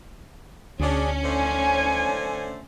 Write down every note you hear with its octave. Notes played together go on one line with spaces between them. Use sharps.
D2 C#4 D4 G#4
D3 A3 C5 G#5